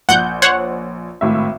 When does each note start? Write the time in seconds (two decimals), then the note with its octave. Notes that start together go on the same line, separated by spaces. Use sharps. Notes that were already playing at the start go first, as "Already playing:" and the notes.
0.09 A#1 F#5 G6
0.42 C5 C#5 F#5
1.21 G#1 A2 E5